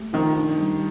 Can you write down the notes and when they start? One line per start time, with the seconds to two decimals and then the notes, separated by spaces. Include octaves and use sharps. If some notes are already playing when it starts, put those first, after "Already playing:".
Already playing: A3 G4
0.13 D#3 F3
0.35 D4
0.58 G3